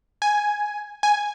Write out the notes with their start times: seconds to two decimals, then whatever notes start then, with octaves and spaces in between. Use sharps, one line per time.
0.22 G#5
1.03 G#5